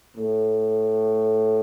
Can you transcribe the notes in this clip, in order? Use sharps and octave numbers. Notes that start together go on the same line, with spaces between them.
A2